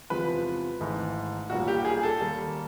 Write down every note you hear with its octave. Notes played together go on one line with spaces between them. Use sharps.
E2 C3 F3 G#3 B4
G#1 G#2 E3 A3
B1 A#2 G3 A#3 F#4
G4
G#4
G#4
A4
D#2 D#3 G3 A#3